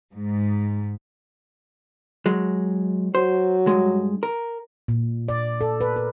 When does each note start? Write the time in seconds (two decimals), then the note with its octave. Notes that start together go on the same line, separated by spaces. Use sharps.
0.13 G#2
2.26 F#3 G#3
3.15 F#3 C5
3.67 G2 G#3
4.23 A#4
4.88 A#2
5.28 D5
5.61 A4
5.81 B4
5.96 A#4